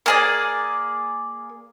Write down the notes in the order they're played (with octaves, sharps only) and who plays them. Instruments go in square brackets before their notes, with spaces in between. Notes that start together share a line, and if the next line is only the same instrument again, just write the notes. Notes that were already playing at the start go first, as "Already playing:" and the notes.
[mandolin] A#3 G#4 D5